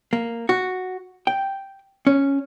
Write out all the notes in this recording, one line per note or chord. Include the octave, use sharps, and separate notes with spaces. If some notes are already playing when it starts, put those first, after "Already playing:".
A#3
F#4
G5
C#4